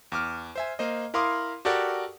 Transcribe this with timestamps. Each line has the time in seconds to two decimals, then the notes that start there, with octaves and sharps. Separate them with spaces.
0.12 E2 D6 F6
0.56 C5 E5 G#5
0.79 A#3 C5 D#5
1.14 E4 A#4 F5 C6 D6 D#6
1.65 F#4 G4 A4 A#4 D5 F#5